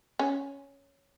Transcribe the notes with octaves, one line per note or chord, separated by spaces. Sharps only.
C#4